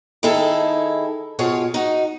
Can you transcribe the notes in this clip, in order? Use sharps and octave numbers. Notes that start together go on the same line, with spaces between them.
D#3 D#4 E4 G#4 A4
B2 F4 G#4 C#5 F5
D#4 F#4